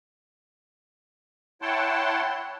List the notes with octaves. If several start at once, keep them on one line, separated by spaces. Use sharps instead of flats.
E4 C#5 F#5 G5 A5 C6